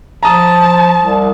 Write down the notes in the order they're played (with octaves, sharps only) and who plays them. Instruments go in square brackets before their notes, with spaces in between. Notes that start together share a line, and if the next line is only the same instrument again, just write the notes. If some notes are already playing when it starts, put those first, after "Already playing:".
[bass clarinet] F3 [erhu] A5 [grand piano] A#5 D#6
[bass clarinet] C2